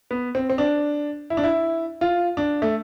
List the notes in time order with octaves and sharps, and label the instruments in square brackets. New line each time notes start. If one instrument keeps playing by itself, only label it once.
[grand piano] B3
C4
C4
D4
E4
D4
E4
F4
D4
A3